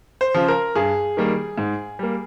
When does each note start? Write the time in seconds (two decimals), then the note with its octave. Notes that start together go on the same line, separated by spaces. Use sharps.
0.21 C5
0.34 C#3 F3
0.48 A#4
0.75 G2 G#4
1.17 D#3 G3 A#3
1.58 G#2
1.99 G3 A#3